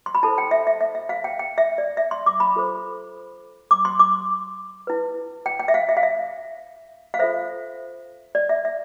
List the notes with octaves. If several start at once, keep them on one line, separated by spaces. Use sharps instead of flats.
C6
B5
E4 A4 C5 A5
G5
E5
E5
E5
E5
F5
G5
G5
E5
D5
E5
C6
D6
B5
F4 A4 C5
D6
C6
D6
E4 B4
G5
G5
E5
F5
E5
F5
E5
F5
F4 A4 C5 E5
D5
E5
E5